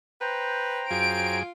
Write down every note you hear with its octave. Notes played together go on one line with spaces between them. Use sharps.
B4 C5 G5 A#5
F#2 F4 G#4 D7